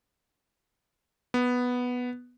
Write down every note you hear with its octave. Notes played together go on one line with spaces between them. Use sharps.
B3